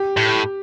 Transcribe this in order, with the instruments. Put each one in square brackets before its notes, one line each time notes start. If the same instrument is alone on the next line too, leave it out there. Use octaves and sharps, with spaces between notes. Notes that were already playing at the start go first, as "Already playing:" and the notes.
Already playing: [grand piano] G4
[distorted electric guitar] A2